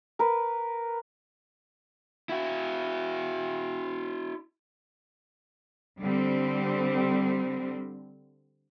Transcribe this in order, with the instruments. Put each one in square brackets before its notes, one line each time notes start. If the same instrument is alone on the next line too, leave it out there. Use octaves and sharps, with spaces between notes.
[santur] A#4 B4
[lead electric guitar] E4 F#4
[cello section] D3 G3 C4